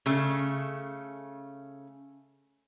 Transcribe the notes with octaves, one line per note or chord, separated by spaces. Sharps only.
C#3 A3